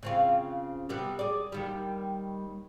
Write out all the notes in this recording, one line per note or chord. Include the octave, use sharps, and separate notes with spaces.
C#3 C4 F4
C3 G3 B3
G#4 D5
D#2 D#3 G3